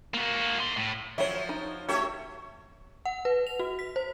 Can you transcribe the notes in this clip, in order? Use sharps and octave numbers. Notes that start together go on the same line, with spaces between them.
A#3 F#4
D#4 C6
A2
F3 F#3 C#5 E5
D#4
A3 F#4 G4 C#5 E5
F#5
B4
F7
F#4
B6
C5